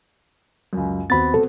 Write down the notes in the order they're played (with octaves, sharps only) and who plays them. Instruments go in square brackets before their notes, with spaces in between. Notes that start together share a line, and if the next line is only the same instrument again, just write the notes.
[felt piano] C#2 F#2
[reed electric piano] D#2 B5 A6 [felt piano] B3 C4 F#4
[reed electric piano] A4